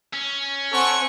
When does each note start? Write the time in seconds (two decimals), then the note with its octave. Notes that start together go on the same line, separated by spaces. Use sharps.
0.13 C#4
0.72 C4 A4 F#5 G#5 C#6